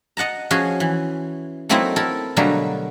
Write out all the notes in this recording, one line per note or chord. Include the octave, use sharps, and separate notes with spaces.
D#5 F#5 A5 A#5
F3 C#4 F#4 G#4
E3
F#3 A3 A#3 C4 D#4 E4
E4 A4 A#4
B2 D3 F#3 G3 A3 A#3